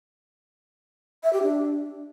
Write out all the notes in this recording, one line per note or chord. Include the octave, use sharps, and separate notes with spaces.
E5
G4
D4